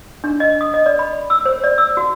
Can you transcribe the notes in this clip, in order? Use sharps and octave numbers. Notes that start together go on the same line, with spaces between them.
D4
D#5
D#6
D#5
D5
B5
E6
C5
D5
E6
F#4